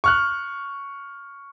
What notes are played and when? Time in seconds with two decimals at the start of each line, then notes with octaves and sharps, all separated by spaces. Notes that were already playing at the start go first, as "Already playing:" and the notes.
0.04 C#6 F6 F#6